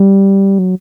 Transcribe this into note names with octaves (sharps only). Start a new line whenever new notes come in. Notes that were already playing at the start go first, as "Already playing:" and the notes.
Already playing: G3
F#3